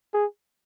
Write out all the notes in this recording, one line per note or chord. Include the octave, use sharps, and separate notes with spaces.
G#4